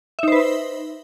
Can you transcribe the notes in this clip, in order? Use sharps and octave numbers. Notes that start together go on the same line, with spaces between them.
D#4 B4 C5 E5